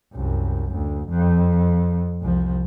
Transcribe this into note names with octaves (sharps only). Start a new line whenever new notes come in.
C2 F#2
D2
F2
C2 F3